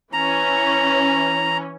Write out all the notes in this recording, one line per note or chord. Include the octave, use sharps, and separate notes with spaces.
E3 C#4 A#5